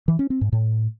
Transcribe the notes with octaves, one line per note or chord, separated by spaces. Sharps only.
E3
C#4
C4
G#2
A2